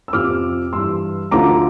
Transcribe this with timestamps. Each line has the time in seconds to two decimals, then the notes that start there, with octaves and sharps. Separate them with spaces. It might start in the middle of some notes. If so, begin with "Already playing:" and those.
0.08 E6
0.13 F2 C3 F3 D6 F6
0.73 G2 E3 C6 E6
1.31 D2 D3 F3 A#5 D6